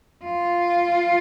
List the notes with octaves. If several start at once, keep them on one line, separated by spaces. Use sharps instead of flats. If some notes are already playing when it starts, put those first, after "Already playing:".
F4